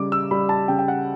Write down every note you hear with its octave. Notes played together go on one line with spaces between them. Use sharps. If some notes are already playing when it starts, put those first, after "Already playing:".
Already playing: C#3 G3 D6
E6
G3 B5
A5
C#3 G5
G5
F#5